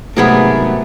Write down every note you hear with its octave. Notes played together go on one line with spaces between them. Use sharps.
G#2 C3 F#3 A3 B3 G#4 A#4